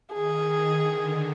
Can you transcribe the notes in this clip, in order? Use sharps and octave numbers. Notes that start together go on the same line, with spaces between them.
D#3 G#4
D3